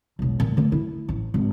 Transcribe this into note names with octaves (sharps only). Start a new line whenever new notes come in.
E1 B1
A#2
D3 A3
E4
A1
G#1